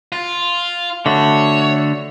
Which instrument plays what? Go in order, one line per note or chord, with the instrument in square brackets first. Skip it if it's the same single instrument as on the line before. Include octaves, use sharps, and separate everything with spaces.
[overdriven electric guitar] F4
[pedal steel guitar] D3 A3 F#4 [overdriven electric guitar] C#5